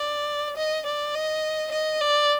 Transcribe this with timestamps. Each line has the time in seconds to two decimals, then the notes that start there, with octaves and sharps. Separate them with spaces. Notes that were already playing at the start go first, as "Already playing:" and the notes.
Already playing: D5
0.57 D#5
0.86 D5
1.15 D#5
1.72 D#5
2.01 D5